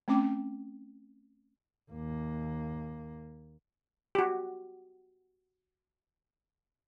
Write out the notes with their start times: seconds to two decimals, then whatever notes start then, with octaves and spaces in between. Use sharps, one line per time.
0.08 A3 C4 C#4 G5 D6
1.91 D#2 A#3
4.15 F#4 G4